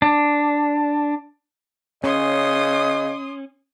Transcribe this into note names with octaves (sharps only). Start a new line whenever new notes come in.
D4
C#3 C#4 D#5 C6 D#6